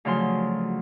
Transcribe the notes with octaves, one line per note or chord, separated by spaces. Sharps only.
D2 C#3 F3 F#3 C6